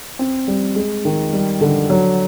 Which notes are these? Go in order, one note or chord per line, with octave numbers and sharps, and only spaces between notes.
C4
G3
G#3
D#3
G3
D3
F#3